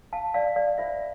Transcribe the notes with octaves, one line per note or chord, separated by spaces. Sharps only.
F5 A5
D5 F5
D5 F5
F4 C5 E5